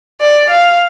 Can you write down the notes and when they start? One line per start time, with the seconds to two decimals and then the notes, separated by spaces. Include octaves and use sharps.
0.21 D5
0.50 F5